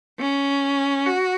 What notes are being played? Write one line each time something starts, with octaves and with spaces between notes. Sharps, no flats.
C#4
F#4